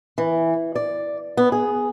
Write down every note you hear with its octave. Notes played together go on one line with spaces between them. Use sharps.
E3
D5
B3
G#4